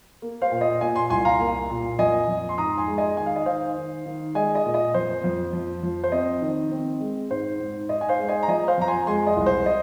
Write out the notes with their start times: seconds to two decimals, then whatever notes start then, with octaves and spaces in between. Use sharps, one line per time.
0.22 A#3
0.42 C5 F5
0.51 A#2
0.61 D#5
0.81 A#2 D#5 G#5
0.95 G#5 C6
1.10 C2 G#5 C6
1.25 F5 A#5
1.40 A#3
1.70 A#2
1.99 F2 D#5 G#5
2.28 F2
2.49 C6
2.58 G#2 A#5 D#6
2.78 G#5 C6
2.88 G#3
2.98 D#5 G#5
3.17 D#3 G#5
3.26 F5
3.36 D#5
3.46 D#3 C5 F5
3.77 D#3
4.06 D#3
4.35 G#3 D#5 G#5
4.55 D#5
4.65 A#2
4.74 D#5
4.94 F2 C5
5.24 F2
5.53 F3
5.83 F3
6.04 C5
6.12 C4 D#5
6.42 D#3
6.72 C4
7.00 G#3
7.31 G#2 C5
7.60 G#2
7.89 G#2 D#5
8.01 G#5
8.09 C5 F5
8.18 G#3
8.28 D#5 G#5
8.43 A#5
8.48 F3 D#5 G#5
8.68 C5 F5
8.78 F2 A#5
8.88 G#5 C6
9.07 G#3 G#5 C6
9.27 D#5
9.36 C2
9.46 C5
9.66 D#5